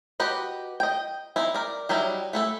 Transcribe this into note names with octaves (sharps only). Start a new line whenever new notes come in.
F#4 G4 B4 D#5
D#5 G5
C4 D#4 E4
A#4 D5
F#3 G3 D#4 E4
A3 E4 A4